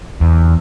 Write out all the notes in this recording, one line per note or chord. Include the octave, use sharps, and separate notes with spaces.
E2